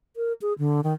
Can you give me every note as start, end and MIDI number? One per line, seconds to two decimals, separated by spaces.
0.16 0.33 70
0.42 0.53 68
0.59 0.81 50
0.84 0.93 51